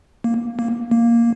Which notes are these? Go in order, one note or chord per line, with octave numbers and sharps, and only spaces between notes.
A#3
A#3
A#3